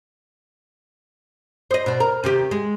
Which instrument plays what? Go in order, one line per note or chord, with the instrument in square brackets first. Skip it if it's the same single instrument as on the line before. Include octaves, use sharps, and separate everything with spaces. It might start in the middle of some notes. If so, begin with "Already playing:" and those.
[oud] C5 D#5
B2 D4
A#4
C3 D#3 G4
G#3